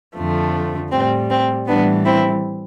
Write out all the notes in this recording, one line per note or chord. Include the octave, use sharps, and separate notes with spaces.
F2 D3 F3 A3
A2 G3 C4
C4
A2 E3 G3 B3 D4
C4 E4